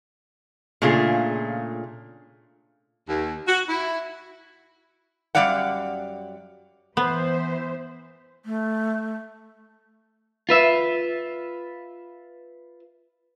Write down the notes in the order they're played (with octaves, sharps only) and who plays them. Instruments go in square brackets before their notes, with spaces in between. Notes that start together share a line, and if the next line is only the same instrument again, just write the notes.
[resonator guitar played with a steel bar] A#2 C#3 A3 D4 F4 G#4
[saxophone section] D#2
F#4
E4
[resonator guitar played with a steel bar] F#2 F3 G3 D5 F5 F#5
[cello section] E3 C5 E5 [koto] B3
[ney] A3
[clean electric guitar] F4 B4 E5